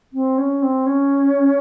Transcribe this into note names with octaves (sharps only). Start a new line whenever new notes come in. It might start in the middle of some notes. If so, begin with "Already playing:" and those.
C4
C#4
C4
C#4